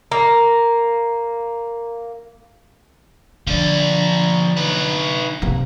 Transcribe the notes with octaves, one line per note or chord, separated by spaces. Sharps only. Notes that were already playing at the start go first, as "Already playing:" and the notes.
A#3 A#5
D3 F3 D5
D#4 B4
C3 A#3